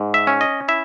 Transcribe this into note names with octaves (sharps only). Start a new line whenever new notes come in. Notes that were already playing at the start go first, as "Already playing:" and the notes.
Already playing: G#2
E5
C#4
D#5
E4 E5